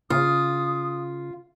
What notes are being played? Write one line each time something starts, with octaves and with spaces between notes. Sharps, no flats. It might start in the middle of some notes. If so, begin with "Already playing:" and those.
C#3 F4 D#6